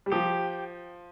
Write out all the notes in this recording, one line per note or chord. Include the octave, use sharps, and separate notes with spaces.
G3
F3 G4